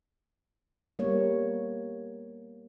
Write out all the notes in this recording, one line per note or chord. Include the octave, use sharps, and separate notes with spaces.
G3 A#3 B3 C#5